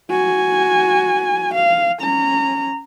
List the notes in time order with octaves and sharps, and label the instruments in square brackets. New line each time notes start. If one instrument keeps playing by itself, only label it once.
[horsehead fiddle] F#4 G#5
F5
C#4 A#5